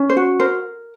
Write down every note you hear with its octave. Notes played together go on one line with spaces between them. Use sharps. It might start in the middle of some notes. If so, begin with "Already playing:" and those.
Already playing: C#4
C5
F#4
A#4 C5